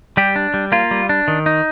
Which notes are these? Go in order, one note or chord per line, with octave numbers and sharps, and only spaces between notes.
G3 G4
D4
G3
A#3 F4
G3
D4
D#3
D#4